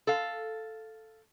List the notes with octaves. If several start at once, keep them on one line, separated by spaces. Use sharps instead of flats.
A4 F5